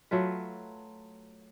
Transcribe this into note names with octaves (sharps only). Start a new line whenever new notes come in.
F#3 A3 F4 B4